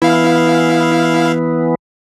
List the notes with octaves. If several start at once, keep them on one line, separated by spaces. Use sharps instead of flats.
E3 B3 E4 F5